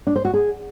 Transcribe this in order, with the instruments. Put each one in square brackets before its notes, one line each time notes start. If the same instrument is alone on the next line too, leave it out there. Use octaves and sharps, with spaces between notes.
[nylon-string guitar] D4
C5
F#4
G#4